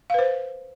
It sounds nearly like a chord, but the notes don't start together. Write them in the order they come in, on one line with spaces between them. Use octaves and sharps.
F5 B4 C5